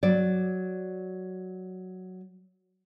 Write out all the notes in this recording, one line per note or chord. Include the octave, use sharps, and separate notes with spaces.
F#3 D5